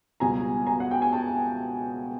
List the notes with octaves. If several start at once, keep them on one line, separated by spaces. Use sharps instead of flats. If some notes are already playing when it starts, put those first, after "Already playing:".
C#2 B2 G3 G#5 A#5
G#5 A#5
F#5
G5
G#5
G5 A5